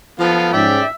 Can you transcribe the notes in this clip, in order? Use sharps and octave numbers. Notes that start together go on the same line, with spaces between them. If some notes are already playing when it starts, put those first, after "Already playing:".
F3 B3 A4 F5
G#2 C#4 D5 E5 G5